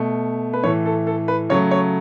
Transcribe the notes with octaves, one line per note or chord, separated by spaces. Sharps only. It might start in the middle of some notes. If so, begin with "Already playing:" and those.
Already playing: B2 A3
B4
A2 E3 A3 C#5
A4
A4
B4
C#3 F#3 A3 C#5
C#5